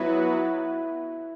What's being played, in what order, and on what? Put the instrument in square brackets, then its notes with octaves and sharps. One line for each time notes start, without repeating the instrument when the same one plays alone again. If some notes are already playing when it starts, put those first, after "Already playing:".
Already playing: [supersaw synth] F#3 B3 F#4 B4 [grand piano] E4